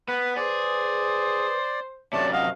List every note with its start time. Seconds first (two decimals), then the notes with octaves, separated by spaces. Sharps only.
0.08 B3 B4
0.36 G#4 B4 C5 D5
2.13 F#2 C3 A3 C#5 D5 A5
2.33 D#5 F5 F#5